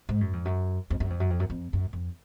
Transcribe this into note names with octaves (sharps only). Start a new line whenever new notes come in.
G#2
F#2
F2
F#2
F2
F#2
F2
F#2
F2
F#2
F2
F#2
F2